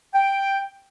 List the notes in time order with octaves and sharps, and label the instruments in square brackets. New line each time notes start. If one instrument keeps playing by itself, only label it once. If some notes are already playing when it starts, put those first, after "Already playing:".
[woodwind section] G5